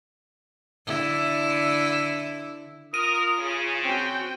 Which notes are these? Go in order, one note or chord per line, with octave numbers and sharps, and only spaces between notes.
D3 E4
F4 A#4 D#6 D#7
C#3
C4 C#4 F#4 G5